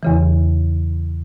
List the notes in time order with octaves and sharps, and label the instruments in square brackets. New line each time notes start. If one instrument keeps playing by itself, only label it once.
[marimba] E2 C#3 E3